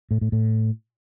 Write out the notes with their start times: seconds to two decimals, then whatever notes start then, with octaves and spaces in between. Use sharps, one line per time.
0.11 A2
0.21 A2
0.32 A2